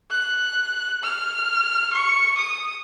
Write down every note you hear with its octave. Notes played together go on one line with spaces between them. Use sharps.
F#6
F6
C#6
D#6